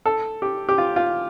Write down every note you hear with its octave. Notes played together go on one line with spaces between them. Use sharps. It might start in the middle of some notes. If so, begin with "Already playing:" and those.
A4
G4
G4
F4
F4